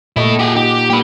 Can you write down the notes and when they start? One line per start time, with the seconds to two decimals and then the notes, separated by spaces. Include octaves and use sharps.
0.16 A#2 E4 A4 D#5
0.39 G4 G#4 F#5
0.56 D#4 G4
0.90 A#3 G4 B4